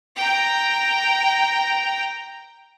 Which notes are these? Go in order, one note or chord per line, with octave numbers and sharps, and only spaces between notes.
G5 A#5